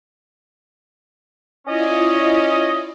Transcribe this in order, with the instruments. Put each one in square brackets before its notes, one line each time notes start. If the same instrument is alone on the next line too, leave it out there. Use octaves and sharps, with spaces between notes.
[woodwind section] C#4 D#5 [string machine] E4 F4 D5